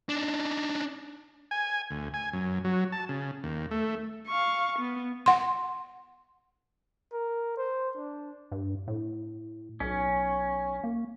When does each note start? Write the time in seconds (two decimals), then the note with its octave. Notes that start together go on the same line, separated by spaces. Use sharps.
0.09 D4 D#4
1.51 G#5
1.91 D2
2.14 G#5
2.33 F#2
2.64 F#3
2.92 A5
3.09 C#3
3.44 D#2
3.71 A3
4.28 F5 C#6
4.79 B3
5.26 F#5 C6
7.13 A#4
7.57 C5
7.97 D4
8.52 G2
8.88 A2
9.80 B1 C#4
10.84 A#3